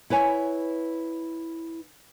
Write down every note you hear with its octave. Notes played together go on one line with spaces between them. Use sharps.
E4 B4 C#5 G#5